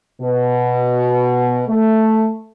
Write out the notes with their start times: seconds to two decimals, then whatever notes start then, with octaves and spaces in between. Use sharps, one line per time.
0.20 B2
1.68 A3